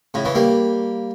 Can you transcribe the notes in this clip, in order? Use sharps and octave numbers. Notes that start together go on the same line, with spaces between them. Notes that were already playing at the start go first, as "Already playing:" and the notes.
A2 C#3
C#3 E3
G3 A#3